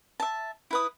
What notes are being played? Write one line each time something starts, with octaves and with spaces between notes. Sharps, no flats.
E5 A5
E4 B4 D#6